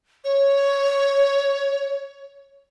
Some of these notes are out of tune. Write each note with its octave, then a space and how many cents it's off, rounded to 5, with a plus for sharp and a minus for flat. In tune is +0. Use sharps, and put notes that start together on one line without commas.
C#5 +5